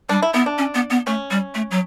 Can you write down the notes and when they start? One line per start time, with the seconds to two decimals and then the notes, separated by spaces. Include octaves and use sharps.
0.09 G3 D4
0.22 E4
0.34 B3 E4
0.46 D4
0.58 C#4
0.74 B3
0.90 B3
1.07 A3 C#4
1.31 G3
1.55 A3
1.71 F#3